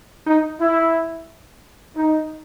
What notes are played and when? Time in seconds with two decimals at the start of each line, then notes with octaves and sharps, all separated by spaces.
0.27 D#4
0.60 E4
1.96 D#4